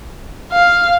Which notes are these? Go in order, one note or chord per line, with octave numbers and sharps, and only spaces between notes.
F5